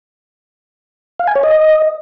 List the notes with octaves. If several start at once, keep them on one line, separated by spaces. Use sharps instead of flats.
F5
G#5
C#5
D#5